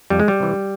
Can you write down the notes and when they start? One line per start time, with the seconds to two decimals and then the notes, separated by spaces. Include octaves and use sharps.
0.10 F2 G3
0.20 G#3
0.28 G3
0.40 C3 E3